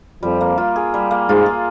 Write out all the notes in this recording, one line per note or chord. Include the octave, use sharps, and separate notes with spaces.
F2 F3 G3
A#3
F4
G#4
G3
A#3
G#2 G#3 F4
G#4